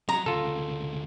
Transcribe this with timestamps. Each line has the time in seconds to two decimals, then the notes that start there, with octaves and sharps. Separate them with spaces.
0.09 F#3 A#5
0.26 D2 C#3 F4 A4